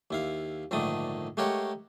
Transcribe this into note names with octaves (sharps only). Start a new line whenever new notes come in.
D#2 E4 F5
A#1 G#2 D3 D#3 A3 D#6
G#3 A3 G4 A#4 C#5 F#5